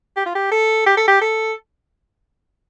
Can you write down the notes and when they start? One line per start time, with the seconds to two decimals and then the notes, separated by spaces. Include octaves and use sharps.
0.16 G4
0.26 F4
0.35 G4
0.52 A4
0.86 G4
0.97 A4
1.07 G4
1.21 A4